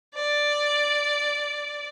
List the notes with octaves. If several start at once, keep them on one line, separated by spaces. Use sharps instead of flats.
D5